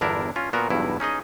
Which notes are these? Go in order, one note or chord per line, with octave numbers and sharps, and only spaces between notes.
G1 E2 D4 E4 A#4
C#4 F4
A#2 B3 F#4 A#4
B1 E2 G2 E4
C#4 D#4 G#4 D#5